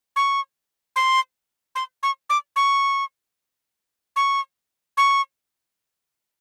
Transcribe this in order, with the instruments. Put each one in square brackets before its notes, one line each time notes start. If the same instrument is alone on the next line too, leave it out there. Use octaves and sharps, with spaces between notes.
[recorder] C#6
C6
C6
C#6
D6
C#6
C#6
C#6